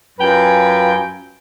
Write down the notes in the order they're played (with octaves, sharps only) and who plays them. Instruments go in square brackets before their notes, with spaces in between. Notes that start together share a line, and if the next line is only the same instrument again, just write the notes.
[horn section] F#2 F4 B4 G5 G#5